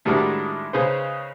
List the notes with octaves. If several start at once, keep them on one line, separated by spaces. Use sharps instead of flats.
A2 D#3 G3 G#3 D4 F#4
C#3 D#4 G#4 B4 C5